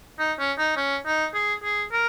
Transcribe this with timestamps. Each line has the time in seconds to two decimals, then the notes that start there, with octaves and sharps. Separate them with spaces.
0.19 D#4
0.39 C#4
0.58 D#4
0.77 C#4
1.06 D#4
1.34 G#4
1.63 G#4
1.92 A#4